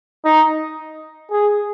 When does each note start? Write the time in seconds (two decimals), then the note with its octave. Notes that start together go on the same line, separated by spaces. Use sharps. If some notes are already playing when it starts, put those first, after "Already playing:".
0.25 D#4
1.31 G#4